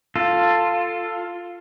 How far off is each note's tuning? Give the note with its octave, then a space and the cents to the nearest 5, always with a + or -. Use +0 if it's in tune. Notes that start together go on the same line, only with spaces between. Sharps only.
F4 +0 A4 +10